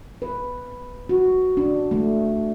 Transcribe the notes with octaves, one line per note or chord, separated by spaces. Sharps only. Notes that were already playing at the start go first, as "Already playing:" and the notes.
B4
F#4
D4
A3